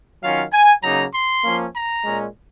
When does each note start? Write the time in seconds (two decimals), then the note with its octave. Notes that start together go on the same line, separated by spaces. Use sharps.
0.22 D#3 F#3 C#4 F4 F5
0.52 G#5
0.83 C#3 F#3 A#3 D#4 A#5
1.13 C6
1.44 F3 A#3 C#4
1.74 A#5
2.04 A#2 G#3 C#4